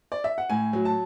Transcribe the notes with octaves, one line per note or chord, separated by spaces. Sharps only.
D5
E5
F#5
A2 G#5
F#3
A5